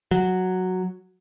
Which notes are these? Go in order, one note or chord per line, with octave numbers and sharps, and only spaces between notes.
F#3